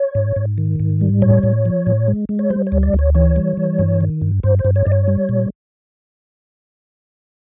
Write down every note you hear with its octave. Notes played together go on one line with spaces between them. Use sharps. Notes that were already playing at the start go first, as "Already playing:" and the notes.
Already playing: C#5
G#2
G#2
D#3
G#2
G3
A2 C#5
A2
F3
A2
G#3
G#3
C#5
G3 C5
C#5
D2
D5
D2
C#5
E3 C#5
G3
E3
G2
D#3
G2
G2 C5
C5
G2
C#5
G2 D5
C#5
G3
A#2